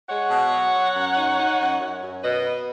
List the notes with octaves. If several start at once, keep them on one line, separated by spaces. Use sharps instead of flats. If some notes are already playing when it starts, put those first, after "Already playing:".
G#3 C#5 F#5
B2
F#3
F#3
F#2
D#4
D#4
F#2
F#2
F#2
B2 B4 D#5
B3